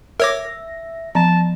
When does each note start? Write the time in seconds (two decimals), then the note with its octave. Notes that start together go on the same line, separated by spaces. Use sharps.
0.20 A#4 C#5 E5 D6 A#6
1.15 F3 A5 A#5